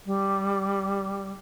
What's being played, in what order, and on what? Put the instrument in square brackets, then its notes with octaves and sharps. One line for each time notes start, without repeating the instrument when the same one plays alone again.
[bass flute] G3